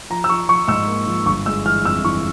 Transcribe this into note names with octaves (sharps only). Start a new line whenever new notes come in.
F3 A#5
E6
F3 C#6
F3 C#6
G#2 E6
A#3
F3
G1 C#6
G#3 E6
E3 F6
F2 E6
E3 C#6